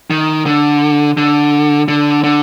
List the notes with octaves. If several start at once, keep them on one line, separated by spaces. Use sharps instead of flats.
D#3
D3
D3
D3
D3